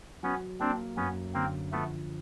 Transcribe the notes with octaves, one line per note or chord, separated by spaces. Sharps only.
F#3 B3 C#4
A#3 C4 D4
F#2 B3 C#4
D3 A#3 C4
F3 A3 B3